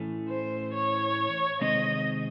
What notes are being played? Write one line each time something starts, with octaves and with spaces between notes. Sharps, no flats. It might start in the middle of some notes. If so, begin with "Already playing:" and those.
Already playing: A2 E3 A3 C#4
C5
C#5
C3 D#3 G#3 C4 D#4 D#5